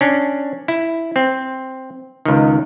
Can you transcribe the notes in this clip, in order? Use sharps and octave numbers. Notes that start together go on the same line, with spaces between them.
C#4 D4
E4
C4
C#2 D#3